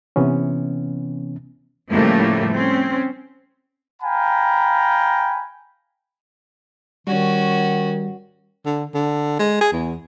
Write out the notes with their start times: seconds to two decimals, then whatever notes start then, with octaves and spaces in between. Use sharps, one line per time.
0.16 C3 E3 B3 C#4
1.91 A2 C#3 F3 G3 A3 A#3
2.52 C4 C#4
4.02 F5 G5 G#5 A#5 B5
7.07 D#3 G3 C#4 F#4
8.66 D3
8.94 D3
9.39 G#3
9.61 G#4
9.72 E2